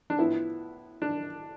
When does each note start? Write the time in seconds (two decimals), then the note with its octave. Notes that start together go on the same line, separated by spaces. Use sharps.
0.10 D4
0.19 A2 F3 B3 E4
1.02 D4